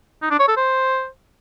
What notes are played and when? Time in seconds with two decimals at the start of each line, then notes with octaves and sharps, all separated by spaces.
0.22 D#4
0.31 D4
0.39 C#5
0.48 A4
0.57 C5